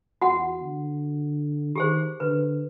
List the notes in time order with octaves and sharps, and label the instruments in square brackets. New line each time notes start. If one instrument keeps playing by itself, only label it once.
[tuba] E2 [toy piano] F#4 F#5
[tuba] D3
[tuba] D#3 [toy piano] G4 G#4 C5
[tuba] D3 [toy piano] B4